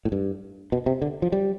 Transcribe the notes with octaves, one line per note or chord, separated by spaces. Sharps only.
A2
G2
B2
C3
D3
F3
G3